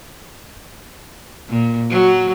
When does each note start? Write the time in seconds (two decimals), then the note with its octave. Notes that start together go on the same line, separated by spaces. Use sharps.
1.49 A#2
1.90 F#3